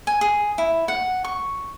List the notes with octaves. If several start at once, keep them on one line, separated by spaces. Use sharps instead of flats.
G#5
G#4
E4
F#5
C#6